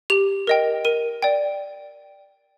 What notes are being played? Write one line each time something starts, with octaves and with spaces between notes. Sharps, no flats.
G4 F7
A#4 D#5 G5
A#4 D#7
D5 G5